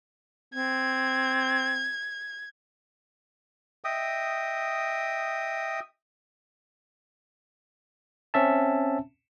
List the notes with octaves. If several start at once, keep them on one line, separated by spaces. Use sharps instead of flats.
C4 G#6
D#5 E5 G5 D#6
C4 C#4 E5 A5